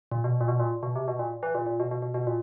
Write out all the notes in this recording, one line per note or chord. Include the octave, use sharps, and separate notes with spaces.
A#2
B2
A#2
B2
A#2
B2
C3
B2
A#2
E3
A#2
A#2
B2
B2
B2
B2
A#2